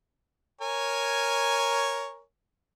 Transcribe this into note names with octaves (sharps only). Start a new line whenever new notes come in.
A#4 C#5 G#5